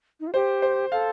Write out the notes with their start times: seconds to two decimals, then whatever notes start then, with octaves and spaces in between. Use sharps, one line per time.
0.20 D#4
0.27 F4
0.34 G4 C5
0.62 C5
0.92 A4 F5